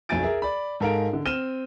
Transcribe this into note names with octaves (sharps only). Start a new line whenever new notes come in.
B1 F2 F#3 G#5 A6 D7
G#4 A#4 E5
D5 B5
G#2 A4 A#4 F5 A#5 D7
D3
C4 F6 D#7 E7 G7